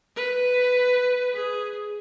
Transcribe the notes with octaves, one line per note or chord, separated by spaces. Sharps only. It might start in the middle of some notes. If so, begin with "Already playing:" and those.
B4
G#4